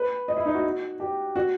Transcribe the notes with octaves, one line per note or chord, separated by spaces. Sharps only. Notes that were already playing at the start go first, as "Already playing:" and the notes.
Already playing: B4
D#5
E4
D#4
F#4
G4
F#4